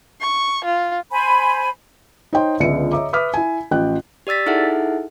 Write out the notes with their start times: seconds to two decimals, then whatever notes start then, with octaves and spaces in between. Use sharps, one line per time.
0.21 C#6
0.64 F4
1.12 C5 G#5 B5
2.33 D#4 C5 C#5 D#5 G5 C6
2.60 C#2 D3 F3 B3 E5 C#7
2.91 C#5 D#5 E5 A#5 D6
3.13 B4 E5 D6 D#6 F6 B6
3.34 E4 G#5
3.71 A1 F3 G5 F#6
4.27 G4 D5 E6 A6 B6
4.46 D#4 E4 G#4 A4 E5 F#5